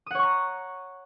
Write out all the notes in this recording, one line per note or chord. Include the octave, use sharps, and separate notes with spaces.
C#5 F#5 A#5 C#6 D#6